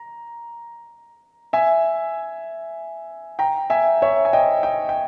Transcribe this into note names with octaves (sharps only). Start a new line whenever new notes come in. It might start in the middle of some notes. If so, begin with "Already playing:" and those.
Already playing: A#5
E5 G#5
G5 A#5
E5 G#5
C#5 E5
G#5
D#5 G5
D#5 G5
G5